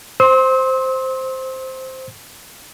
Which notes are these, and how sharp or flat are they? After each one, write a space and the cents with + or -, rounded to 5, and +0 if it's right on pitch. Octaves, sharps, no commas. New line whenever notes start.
C5 +0 C6 +20 E6 -40